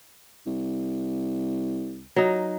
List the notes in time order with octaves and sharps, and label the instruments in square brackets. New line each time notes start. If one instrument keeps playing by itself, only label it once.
[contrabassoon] C2
[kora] F#3 D#4